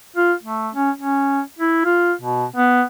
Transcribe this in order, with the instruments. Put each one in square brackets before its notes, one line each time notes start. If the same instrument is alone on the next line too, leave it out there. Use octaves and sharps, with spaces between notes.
[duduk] F4
A3
C#4
C#4
E4
F4
B2
B3